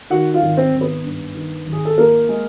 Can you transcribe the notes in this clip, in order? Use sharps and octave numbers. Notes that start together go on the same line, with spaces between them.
D#3 F#4 F#5
F4 F5
G#1
C4 C5
G#1
B3 B4
G2
D#3
G#1
G#4
A4
F3 A#3 A#4
G#3